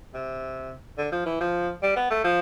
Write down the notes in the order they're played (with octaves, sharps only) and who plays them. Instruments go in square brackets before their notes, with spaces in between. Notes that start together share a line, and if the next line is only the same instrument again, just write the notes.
[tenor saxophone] C3
D3
F3
E3
F3
G3
B3
A3
F3